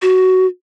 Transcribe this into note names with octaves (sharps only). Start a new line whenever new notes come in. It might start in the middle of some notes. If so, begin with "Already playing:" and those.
F#4